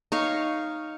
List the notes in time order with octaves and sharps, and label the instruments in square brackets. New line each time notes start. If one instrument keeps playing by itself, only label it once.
[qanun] D#4 C#5 F5